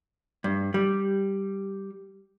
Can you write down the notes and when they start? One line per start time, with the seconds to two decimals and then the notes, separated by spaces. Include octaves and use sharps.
0.44 G2
0.74 G3